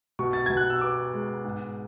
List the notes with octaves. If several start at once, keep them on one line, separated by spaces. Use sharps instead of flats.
B2 C#6
A6
B2 G#6
F#6
E6
B3 D6
G#3
G#2